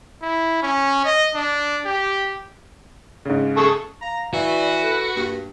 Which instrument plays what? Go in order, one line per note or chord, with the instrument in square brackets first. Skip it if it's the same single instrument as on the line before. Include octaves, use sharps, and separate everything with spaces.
[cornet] E4
C#4
D#5
D4
G4
[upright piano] G#2 C#3
[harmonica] G#4 A4 C#6
[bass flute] F5 [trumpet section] A#5
[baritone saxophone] E3 [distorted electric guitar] F#4 [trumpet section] B4 [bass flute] D5
[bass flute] A4
[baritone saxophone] G2 [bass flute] A#3